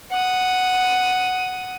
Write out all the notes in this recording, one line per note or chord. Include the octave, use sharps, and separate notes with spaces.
F#5 D#6